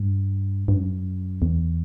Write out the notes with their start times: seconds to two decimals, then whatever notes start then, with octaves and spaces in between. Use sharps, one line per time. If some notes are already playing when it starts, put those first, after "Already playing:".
Already playing: G2
0.68 G2
0.73 F#2
1.42 E2